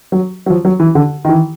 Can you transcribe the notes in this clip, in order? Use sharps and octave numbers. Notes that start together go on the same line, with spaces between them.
F#3
F#3
F3
F#3
E3
D3
D#3
E3